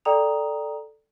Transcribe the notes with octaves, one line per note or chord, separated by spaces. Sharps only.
A4 D5 G5 A#5 D#6 F7